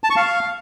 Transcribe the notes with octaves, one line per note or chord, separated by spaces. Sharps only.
A5
C#6
F5